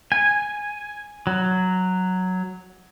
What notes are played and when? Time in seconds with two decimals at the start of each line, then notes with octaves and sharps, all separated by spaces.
0.12 G#5
1.27 F#3